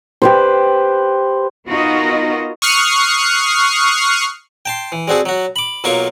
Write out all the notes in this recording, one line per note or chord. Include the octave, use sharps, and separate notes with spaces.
G4 B4 C5
B3 D#4 F4 F#4 A#4 D#5
C#6 D#6 F6 F#6 C7
G5 A5 C6
E3
G3 C4 F#4 G#4 A4
F#3 F#4
B5 D6
B1 F#3 A#3 F4 C#6 D6